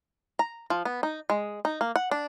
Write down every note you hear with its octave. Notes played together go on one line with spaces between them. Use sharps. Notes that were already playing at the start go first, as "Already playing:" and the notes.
A#5
F3
B3
D#4
G#3
D#4
A#3
F#5
D4